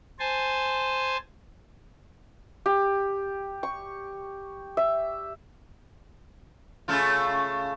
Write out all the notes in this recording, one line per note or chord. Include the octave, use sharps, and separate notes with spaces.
C5 G#5 A5
G4
C#6
E5
C#3 A3 F4